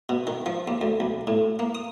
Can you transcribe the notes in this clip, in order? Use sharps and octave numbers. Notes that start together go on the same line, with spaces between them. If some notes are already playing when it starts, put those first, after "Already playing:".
B2
D#3
F3
D#2
D2
B1
A2
A#3
D#6